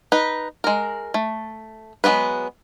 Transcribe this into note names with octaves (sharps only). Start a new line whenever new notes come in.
D#4 B4
G#3 A#4
A3
F#3 G#3 A#3 B3 B4